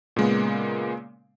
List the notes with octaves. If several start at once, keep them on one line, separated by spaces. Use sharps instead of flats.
A#2 C#3 G#3 A#3 B3